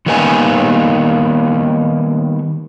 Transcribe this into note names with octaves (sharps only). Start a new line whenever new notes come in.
D#3 G3 A#3 B3 D#4 G#5